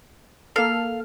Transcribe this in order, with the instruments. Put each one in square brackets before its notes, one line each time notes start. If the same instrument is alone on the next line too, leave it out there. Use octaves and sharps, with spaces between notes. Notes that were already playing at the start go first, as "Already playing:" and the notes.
[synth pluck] A#3 A4 [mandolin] F5